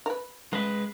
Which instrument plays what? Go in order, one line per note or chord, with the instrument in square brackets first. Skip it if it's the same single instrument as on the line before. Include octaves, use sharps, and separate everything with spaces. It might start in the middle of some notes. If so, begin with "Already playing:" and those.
[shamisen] A#4 B4
[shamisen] C#3 [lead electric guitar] G#3 B4